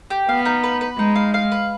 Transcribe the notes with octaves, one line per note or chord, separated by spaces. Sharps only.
G4
B3 F5
D#4
B4
B4
G#3 D#4
F5
F5
B4